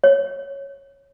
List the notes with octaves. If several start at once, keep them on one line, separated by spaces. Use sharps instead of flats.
C#5